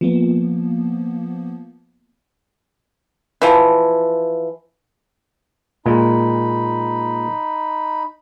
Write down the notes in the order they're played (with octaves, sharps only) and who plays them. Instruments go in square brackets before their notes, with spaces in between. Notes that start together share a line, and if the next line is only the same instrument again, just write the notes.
[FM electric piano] F3 A#3 B3
[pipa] E3 F3
[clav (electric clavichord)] A#2 G#3 [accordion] D#4 B5